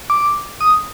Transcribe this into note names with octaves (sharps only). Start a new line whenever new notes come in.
D6
D#6